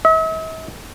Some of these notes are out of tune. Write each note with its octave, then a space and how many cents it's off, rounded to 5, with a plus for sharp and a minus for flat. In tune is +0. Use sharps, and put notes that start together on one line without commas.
E5 -45